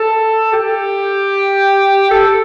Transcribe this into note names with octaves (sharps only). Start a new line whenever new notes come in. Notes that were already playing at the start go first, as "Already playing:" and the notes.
Already playing: A4
G4
A4